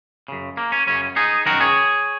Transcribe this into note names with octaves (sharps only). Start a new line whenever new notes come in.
F#2 C#3
A#3
C#4
F#2 C#3 C#4
D#4 G#4
F#2 D#3 F#4 A#4
G#4 C#5